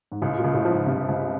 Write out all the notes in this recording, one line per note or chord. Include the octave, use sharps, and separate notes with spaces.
G#2
C#2 A2
A#2
C#2
A2
F3
G#2
G2 C3
C#2